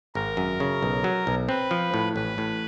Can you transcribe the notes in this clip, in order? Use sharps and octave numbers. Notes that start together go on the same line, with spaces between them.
G#1 A#4
F#2
C#3
B1
F#3
B1
C4 B4
F3
A2
A1 B4
A2